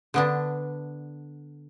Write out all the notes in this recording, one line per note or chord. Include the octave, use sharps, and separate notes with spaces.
D3 B3 D4